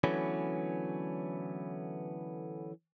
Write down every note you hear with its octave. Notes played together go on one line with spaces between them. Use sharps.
D3 E3 F#3 A3 B3 C#4